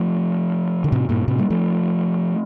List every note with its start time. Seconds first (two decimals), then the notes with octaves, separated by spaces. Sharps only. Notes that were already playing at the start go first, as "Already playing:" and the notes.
Already playing: F3 A3
0.84 D3
0.92 A2 C3
1.09 G2 A#2
1.28 A2 C3
1.39 G3 A#3
1.50 F3 A3